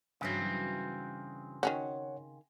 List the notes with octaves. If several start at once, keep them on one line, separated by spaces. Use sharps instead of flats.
G2 C#3 E3 F#3 C4
D#3 C#4 F#4 C#5 F#5